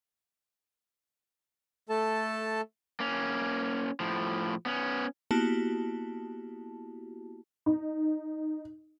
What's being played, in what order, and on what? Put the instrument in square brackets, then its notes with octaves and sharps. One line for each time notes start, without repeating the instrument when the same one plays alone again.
[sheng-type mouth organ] A3 A4 A5
[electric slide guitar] A#3 C#4
A2 F3
B3 C#4
[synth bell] A#3 B3 E4 F#4 G4 A5
[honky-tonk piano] D#4